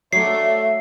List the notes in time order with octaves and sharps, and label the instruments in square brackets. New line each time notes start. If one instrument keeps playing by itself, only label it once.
[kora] F#3 [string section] A3 D4 [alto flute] E5 [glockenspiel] C7